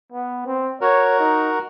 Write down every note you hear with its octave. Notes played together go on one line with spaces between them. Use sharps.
B3
C4
F#4 A#4 C#5
D#4